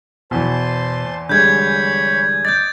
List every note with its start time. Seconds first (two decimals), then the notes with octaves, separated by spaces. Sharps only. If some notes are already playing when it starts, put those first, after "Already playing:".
0.31 E2 B2 E3 C5 A5 C6
1.29 D3 G3 G#3 C#5 B5 G6 G#6
2.45 D#5 D6 G6 A6